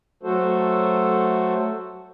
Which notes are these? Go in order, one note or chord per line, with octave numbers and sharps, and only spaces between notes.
F#3 A3 F#4 A4 C5